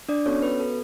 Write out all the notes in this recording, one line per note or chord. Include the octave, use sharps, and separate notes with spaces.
D4 D5
B3 C#4 F#4 A4 C#5
B4
A4